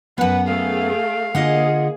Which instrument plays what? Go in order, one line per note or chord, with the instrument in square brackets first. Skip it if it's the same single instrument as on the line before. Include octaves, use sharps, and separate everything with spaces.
[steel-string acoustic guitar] F#2 B3 [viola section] B4 [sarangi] F#5
[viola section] A3 G#4 [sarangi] F5
[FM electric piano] D3 [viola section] A#3 G#4 [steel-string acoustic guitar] F4 D#5 F#5